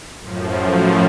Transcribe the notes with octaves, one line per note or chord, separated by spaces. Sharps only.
F#2 A2 F3